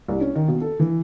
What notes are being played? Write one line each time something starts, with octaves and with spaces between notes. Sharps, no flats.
C2
C#4
D#3
B2
A4
E3